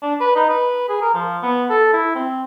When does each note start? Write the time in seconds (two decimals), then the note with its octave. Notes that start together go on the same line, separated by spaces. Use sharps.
0.02 D4
0.20 B4
0.36 D#4
0.49 B4
0.89 G#4
1.02 A#4
1.14 F3
1.43 B3
1.70 A4
1.94 E4
2.15 C4